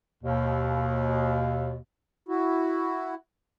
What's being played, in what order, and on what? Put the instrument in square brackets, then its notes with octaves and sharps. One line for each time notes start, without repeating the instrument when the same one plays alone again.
[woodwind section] D#2 B2
[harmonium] E4 F#4